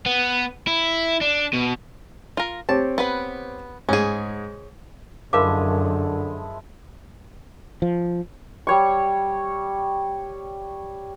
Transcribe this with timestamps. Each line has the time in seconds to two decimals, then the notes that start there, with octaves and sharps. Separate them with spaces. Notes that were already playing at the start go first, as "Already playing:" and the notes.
0.06 B3
0.68 E4
1.21 D4
1.53 B2
2.37 F4 A#4
2.69 C4 G4 C#5 A5
2.98 B3 B4 B5
3.89 G#2 C#4 G#4
5.33 F#2 D3 F3 G#3 E4 A#4 F5 D6
7.82 F3
8.67 G3 C#5 C#6